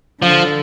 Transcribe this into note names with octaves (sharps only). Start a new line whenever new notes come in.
D3 F3